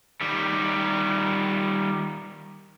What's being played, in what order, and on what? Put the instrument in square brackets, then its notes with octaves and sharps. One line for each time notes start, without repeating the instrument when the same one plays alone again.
[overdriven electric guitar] D#3 G3